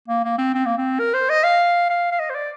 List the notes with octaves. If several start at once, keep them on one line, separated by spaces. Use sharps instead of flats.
A#3
A#3
C4
C4
A#3
C4
A#4
C5
D#5
F5
F5
F5
D#5
C5
D5